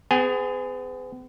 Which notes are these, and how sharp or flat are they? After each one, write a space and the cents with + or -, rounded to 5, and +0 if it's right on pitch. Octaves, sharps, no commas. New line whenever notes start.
B3 +45 G#4 +0 G#5 +0